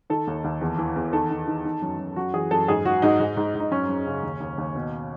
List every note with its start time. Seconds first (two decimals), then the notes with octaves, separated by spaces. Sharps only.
0.10 D#3 A4
0.27 D#2
0.44 D#2
0.61 E2
0.78 E3
0.96 E2
1.13 D#3 A4
1.30 D#3
1.48 D#3
1.65 D#3
1.82 F#2
1.99 F#2
2.16 F#2 F#4
2.34 E3 G#4
2.51 F#2 A4
2.68 G#2 G#4
2.85 G#2 F#4
3.02 G#2 D#4
3.20 G#2
3.37 G#2
3.55 G#2
3.60 D#4
3.71 F#2 C#4
3.89 F#2
4.07 C#3
4.23 D#2
4.40 D#2
4.58 D#2
4.75 B2